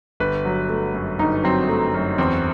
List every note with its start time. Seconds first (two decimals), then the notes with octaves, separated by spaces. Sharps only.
0.20 G1 B4
0.45 F#3
0.69 A3
0.94 F#2
1.19 G1 D#4
1.43 F#3 C4
1.69 A3
1.94 F#2
2.18 E2 C4